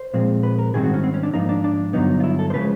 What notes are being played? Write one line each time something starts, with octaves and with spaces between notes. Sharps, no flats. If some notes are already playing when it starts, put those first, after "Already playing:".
Already playing: C5
A#2 F3 G#3 C4
B4
A#4
G#2 D#3 G3 C4 G#4
F#4
C#4
C4
C#4
D4
G#2 F3 A#3 D#4
D4
D4
G2 D3 F#3 B3 D#4
F4
E4
A4
C5
C#3 F3 G#3 B4